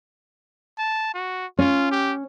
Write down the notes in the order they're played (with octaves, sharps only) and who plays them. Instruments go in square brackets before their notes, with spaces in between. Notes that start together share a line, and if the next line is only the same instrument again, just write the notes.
[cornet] A5
F#4
[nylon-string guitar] C#4 [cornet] F4
[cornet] G4